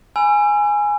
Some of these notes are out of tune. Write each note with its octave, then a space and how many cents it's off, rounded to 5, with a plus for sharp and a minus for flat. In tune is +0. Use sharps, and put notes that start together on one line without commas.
G#5 +0 B5 +0 E6 +40